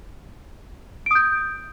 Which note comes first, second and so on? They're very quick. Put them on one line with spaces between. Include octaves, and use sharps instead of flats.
D7 D#6 G6